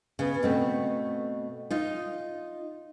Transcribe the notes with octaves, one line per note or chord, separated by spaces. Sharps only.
C#3 B3
B2 A3 C4
D#4 F4